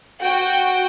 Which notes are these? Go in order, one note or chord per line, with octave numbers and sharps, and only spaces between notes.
F#4 G5